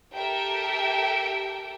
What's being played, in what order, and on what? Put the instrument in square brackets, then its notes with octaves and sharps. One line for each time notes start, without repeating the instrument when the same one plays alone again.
[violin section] G4 A4 A#4 E5 G5 D7